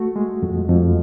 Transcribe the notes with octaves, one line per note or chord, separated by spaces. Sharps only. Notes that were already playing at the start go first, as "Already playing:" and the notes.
Already playing: A3 F#4
G#3
F2
F2